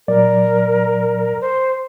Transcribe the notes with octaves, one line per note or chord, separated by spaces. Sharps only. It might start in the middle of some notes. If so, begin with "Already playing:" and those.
A#2 F#3 A#4 D5
C5